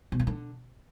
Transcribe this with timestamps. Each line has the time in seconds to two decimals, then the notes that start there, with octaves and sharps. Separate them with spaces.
0.12 B2
0.19 D#3
0.27 D3